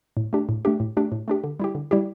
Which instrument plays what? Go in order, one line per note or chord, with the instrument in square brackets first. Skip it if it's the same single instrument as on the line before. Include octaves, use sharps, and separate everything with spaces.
[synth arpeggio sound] A2
A3 D4 G4
A2
A3 D4 G4
A2
A3 D4 G4
A2
A3 D4 G4
D3
G3 E4 G4
D3
G3 E4 G4